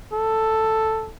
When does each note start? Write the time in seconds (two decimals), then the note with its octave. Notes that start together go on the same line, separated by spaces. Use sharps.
0.13 A4